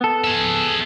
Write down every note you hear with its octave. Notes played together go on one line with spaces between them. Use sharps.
B3 A4
G#4 E5